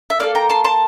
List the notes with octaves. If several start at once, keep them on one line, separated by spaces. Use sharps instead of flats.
E5
A#3 E4 A4 D5 F5
G5 A#5
A5 C6
A5 C6